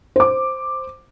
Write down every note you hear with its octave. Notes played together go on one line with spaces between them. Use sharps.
C5 D6